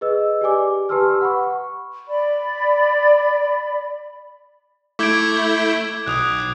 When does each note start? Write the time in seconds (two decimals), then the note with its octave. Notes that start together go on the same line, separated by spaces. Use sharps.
0.01 G#4 B4 D#5 E6
0.41 G4 D5 G#5 D6
0.89 G4 B4 A5 C6 E6 F6
1.21 F#5 B5 C#6
1.43 C#6
2.08 D5 B5
4.99 A3 E4 D6 G6 G#6 D7
6.06 B1 D#6 F#6